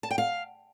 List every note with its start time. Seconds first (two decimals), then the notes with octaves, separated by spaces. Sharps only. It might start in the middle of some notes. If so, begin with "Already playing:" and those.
0.03 A5
0.11 G5
0.18 F5